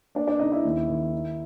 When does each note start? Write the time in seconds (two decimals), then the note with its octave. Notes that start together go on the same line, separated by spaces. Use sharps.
0.15 A#3 D4 D5
0.28 D4 D5
0.39 C#3 D#4 D#5
0.52 E4 E5
0.65 D#2
0.89 D#3
1.13 D#4